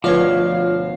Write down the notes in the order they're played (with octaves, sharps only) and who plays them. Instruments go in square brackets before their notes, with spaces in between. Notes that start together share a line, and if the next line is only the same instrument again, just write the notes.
[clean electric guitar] D2 B2 [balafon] F3 B4 [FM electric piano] F4 C#5 [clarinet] F5